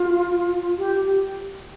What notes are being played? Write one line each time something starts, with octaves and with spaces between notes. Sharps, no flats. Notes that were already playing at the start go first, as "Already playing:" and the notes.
Already playing: F4
G4